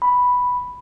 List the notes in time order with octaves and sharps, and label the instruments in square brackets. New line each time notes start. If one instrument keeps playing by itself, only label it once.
[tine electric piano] B5